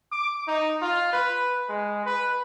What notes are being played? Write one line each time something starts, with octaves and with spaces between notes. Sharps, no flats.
D6
D#4
F4
B4
G#3
B4